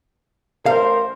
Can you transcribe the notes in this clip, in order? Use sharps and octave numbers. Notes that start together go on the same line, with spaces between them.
A1 A#4 C5 F5